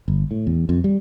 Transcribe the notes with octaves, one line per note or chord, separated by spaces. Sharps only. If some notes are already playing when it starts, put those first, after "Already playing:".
G1
A2
E2
F2
G3